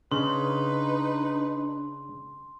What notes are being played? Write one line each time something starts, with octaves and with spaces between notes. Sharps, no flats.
C#3 D4 D#4 B4 C6